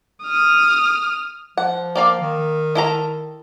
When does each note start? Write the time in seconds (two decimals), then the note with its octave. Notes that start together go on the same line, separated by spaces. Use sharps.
0.23 D#6 F6
1.57 F3 F#5
1.95 A#3 D5 F5
2.20 D#3
2.75 E4 A4 A#5